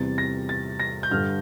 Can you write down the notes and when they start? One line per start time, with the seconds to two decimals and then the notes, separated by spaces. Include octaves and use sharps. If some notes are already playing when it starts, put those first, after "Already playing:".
Already playing: E2 C3 G3 A6
0.18 A#6
0.49 A6
0.80 A#6
1.03 G6
1.11 G2 D3 G3 F6